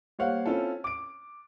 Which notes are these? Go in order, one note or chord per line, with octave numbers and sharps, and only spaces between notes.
G3 A#3 C5 C#5 F5 F#5
C4 C#4 E4 F4 A4
D6 D7